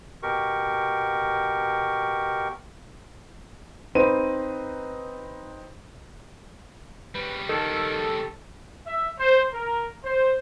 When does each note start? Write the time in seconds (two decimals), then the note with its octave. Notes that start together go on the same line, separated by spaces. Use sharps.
0.23 B2 G4 A#4 C#6
3.95 B3 C4 D#4 B4 C6 D#7
7.15 C#3 G3 B4
7.49 D#3 A4
8.86 E5
9.18 C5
9.52 A#4
10.03 C5